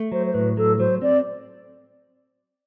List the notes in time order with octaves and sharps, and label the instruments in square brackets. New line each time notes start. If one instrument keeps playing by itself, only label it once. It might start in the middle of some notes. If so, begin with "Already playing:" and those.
Already playing: [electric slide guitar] A3
[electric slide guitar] F#3 [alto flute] C5
[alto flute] C5
[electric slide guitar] A2 [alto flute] B4
[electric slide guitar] F#3 [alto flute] A4
[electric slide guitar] F#3 [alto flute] C5
[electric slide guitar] C4 [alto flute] D5